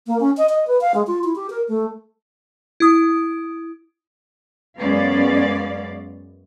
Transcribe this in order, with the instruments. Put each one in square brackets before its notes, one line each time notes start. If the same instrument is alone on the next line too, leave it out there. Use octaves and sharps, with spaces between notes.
[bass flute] A#3
C#4
D#5
D#5
B4
F5
G#3
F4
E4
G4
A#4
A3
[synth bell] E4 D#6
[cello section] F#2 G#3 B3 C#4 D5 F5